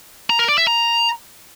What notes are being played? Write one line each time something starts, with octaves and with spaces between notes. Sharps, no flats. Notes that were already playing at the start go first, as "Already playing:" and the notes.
A#5
A#4
D5
E5
A#5